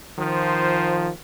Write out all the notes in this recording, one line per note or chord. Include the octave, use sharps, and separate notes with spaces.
D#3 F3 C5